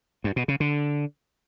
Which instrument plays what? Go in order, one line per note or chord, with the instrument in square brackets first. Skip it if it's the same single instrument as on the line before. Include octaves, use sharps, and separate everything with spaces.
[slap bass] G2
B2
C#3
D3